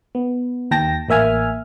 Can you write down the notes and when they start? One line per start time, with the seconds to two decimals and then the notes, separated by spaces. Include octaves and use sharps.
0.15 B3
0.71 D#2 G5 A5 A#6
1.09 A1 A#3 E5 G#5 F6